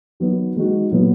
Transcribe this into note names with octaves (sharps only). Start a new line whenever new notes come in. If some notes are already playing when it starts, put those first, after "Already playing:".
D#3 F#3 B3 F#4
D#3 G#3 D#4 F#4
A#2 F#3 B3